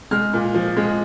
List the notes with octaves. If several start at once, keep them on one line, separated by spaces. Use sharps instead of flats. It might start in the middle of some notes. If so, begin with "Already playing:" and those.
G#3 F6
A#2
F3
G#3